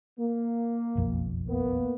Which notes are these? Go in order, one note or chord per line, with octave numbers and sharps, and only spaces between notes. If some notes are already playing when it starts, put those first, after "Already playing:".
A#3
F#1 B1 F2
A#3 B3